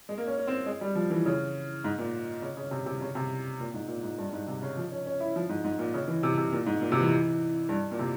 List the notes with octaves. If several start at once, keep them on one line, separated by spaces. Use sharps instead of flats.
G#3
A#3
C#4
C#4
C4
G#3
G3
F3
E3
C#3
G#2
A#2
C#3
C#3
C3
C3
C#3
C3
A#2
G#2
A#2
G#2
G2
G2
G#2
C3
C#3
F3
C#4
C#4
E4
F3
G#2
G#2
A#2
C#3
E3
C3
C3
A#2
G#2
A#2
C3
E3
G2
A#2
C3